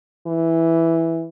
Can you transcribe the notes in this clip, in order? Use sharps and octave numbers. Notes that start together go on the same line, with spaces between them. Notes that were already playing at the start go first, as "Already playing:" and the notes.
E3